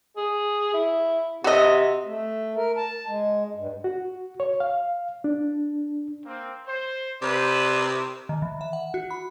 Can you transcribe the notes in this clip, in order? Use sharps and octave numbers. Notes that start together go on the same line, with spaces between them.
G#4
E4
C3 F#4 D#5
A3
A#4
A5
G#3
G2
F#4
C#5
F5
D4
A#3 C4
C5
C3 B4 C5 D5
D#3
E3
E5
F#5
F#4
B5